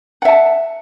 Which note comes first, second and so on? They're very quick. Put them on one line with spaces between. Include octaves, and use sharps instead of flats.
F#5 E5 A5